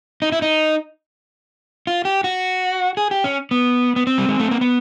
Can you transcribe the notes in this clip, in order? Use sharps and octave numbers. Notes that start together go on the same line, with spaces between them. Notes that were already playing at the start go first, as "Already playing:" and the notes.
D#4
E4
D#4
F4
G4
F#4
G#4
G4
C#4
B3
B3
C4
G3
G#3
A3
A#3
B3